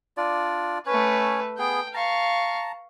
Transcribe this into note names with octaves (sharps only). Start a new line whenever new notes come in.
D4 F4 D5
A3 C#4 B4 C#5
B3 G#4 G5
F5 A5 A#5 C#6